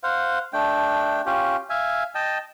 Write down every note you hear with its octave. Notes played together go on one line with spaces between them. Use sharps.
C5 F5 F#5
A3 D4 G5
C#4 F4 G4
E5 F5 G#5
D#5 G5 A5